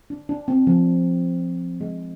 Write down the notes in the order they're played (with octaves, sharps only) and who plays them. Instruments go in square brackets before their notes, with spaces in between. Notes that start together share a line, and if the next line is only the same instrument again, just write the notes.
[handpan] D4
D4
C4
F3
G#3